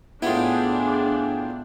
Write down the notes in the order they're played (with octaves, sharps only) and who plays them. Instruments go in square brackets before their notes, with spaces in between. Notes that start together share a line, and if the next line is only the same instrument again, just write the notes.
[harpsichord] A2 B3 [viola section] D4 [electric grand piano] E4 F4 [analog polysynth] G#4 G5